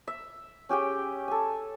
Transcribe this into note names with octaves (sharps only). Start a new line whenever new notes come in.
E5
C#4 G4 G#4 G5
A4 G#5